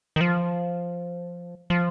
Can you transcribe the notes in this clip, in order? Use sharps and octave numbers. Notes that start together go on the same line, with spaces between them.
D#3
F3
F3